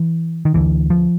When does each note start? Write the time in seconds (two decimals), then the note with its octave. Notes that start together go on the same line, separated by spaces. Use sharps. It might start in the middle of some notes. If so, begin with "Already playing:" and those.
Already playing: E3
0.45 D#3
0.54 D2 D3 E3
0.90 F3